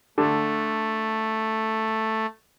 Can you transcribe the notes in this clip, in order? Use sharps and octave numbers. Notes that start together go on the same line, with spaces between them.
D3 A3